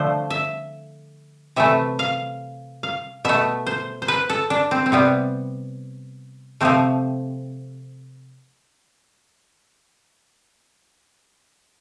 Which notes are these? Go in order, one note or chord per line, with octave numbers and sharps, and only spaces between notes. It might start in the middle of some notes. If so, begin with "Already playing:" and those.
Already playing: D3 F3 A3 C5
E5
C3 E3 A3 E5
F5
F5
B2 A3 E5
C5
C5
B4
A4
D4
C4
C4
C3 G3 B3
C3 F3 A3 C4